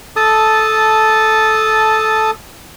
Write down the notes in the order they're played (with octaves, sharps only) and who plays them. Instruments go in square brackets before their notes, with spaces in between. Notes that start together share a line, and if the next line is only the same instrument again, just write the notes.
[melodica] A4 A5 D#6